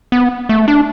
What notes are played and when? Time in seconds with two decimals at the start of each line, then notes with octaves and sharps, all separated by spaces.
0.12 B3
0.49 A3
0.68 D4